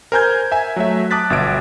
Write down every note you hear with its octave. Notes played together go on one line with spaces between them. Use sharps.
A#4 C5 G#5 A#5 G6 G#6
E5 G#5
F#3 A3 E5
A5 D6 D#6 F#6 A6 B6
G1 B2 E5 D7